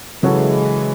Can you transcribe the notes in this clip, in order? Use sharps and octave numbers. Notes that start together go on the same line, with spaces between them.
C#3 E3 F#3 G#3 C#4 F#4 A4